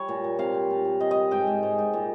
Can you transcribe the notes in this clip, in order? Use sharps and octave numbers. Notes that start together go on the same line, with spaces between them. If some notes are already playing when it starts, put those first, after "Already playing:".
Already playing: G3 C#5
A#2
A#2
C3 F5
C3
A#2
A#2
C3 D#5
D#5
C3
G#2 G5
G#2
G#2
G#2
A#2